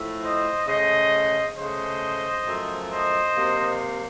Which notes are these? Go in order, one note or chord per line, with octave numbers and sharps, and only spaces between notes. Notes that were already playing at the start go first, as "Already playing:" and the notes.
Already playing: A2 F3 A3
C5 D#5
C#3 A3 C5 D#5
C#3 A3 C5 D#5
F#2 F3 A3
C5 D#5
C3 F#3 A#3